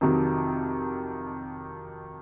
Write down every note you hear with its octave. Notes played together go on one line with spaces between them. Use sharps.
F2 C3 D#3 F#3